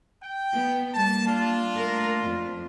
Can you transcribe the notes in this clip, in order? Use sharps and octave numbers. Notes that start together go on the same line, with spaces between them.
G5
B3
G3 A#3 A5
D4 F4
A3 A#4
F2